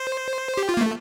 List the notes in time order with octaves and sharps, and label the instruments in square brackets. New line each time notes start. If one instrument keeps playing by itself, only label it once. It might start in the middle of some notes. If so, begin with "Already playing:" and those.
Already playing: [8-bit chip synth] C5
G4
F4
A#3
A3